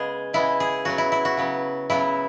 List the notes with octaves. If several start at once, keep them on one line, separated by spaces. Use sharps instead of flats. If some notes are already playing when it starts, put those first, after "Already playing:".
Already playing: C#3 G#3 B3 G#4
C#3 G#3 B3 E4
G#4
C#3 F#3 B3 F#4
E4
E4
F#4
C#3 F#3 B3
C#3 F#3 B3 E4